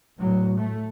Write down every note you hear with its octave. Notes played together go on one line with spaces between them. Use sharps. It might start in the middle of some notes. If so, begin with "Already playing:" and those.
A2 F#3
A3